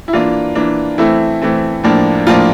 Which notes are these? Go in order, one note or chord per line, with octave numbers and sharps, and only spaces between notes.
E4
E3 A#3 D4 F4
E3 A#3 D4
E3 A3 C4 E4
E3 A3 C4
A2 F3 A#3 D4
A2 F3 A#3 D4 F4